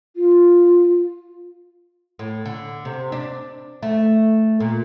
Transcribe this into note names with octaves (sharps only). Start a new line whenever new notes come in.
F4
A2
D3
C3
D4
A3
A#2